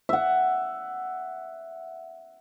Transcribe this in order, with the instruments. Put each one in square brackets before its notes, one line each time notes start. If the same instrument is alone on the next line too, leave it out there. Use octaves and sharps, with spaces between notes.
[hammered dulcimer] E5 F#5